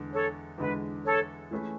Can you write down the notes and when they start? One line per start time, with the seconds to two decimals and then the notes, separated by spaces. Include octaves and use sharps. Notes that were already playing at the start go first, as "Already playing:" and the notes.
Already playing: E2 D3 G#3
0.12 A4 C#5
0.58 E2 D3 G#3 B4
1.05 A4 C#5
1.51 E3 A3 C#4 G#4 B4